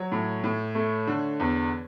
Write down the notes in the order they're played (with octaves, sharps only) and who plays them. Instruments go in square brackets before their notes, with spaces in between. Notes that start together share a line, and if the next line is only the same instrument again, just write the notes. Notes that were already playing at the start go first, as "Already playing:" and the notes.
Already playing: [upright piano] F#3 C#5
A2
A2
A3
D3
E2